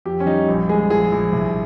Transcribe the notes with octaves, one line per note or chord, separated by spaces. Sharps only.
F2 G4
C#4
G3 D#4
A#1
G#3 G#4
A#1 G#4
A#1
C2